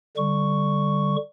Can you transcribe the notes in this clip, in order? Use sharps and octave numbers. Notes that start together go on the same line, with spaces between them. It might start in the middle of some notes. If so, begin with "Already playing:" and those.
D3 G3 C#6